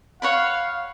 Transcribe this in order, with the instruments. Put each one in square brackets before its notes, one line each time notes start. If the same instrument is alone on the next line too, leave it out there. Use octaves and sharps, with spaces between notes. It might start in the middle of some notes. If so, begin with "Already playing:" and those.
[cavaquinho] C#5 F#5 B5 [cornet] F5